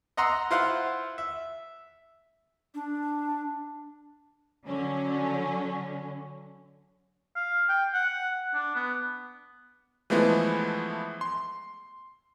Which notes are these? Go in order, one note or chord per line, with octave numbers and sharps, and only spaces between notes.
D#5 F#5 A#5 C6 E6
E4 F4 C5 F5 F#5
E5
D4
D3 F#3 C#4
F5
G5
F#5
D4
B3
E3 F3 G#3 A3 B3 E4
C6